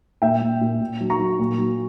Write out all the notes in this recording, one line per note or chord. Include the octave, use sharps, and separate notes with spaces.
A#2 E5 G5
A#2
A#2
A#2
F#3
A#5 C#6
F#3
A#2
F#3